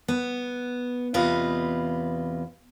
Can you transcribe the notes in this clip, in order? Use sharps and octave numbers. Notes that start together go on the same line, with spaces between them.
B3
E2 C3 F4 B4 D#5